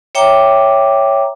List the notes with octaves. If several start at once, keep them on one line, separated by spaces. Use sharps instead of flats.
C#5 E5 G5 A#5 D6